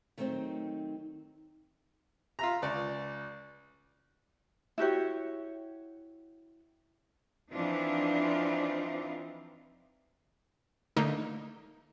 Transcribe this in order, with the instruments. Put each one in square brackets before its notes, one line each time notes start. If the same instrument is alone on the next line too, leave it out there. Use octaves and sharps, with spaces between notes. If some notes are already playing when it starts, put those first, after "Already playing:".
[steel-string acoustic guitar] D#3 F#3 A3 C4 D#4
[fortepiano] F4 E5 A#5
C#2 D5 C#6
[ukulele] E4 F#4 G4 C#5
[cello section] E3 F3 C4 D4 D#4 F4
[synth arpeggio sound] D3 A3 A#3 D#4